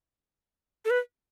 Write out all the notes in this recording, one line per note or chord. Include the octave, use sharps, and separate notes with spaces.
A4
B4